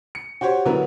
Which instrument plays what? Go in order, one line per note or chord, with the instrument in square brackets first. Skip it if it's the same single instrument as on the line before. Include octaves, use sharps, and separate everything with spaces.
[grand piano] C#7
F#4 G4 C5 C#5
D3 F#3 B3 E4 A#4